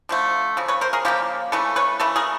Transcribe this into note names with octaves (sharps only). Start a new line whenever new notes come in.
D3 F3 A3
C#3 F3
B4 C#5
A#4 C5
G#4 A#4
C#3 F3 A#3 F4 G4
C#3 E3 A3 A4 B4
B4 C#5
C#3 E3 A3 A4 B4
G#4 A#4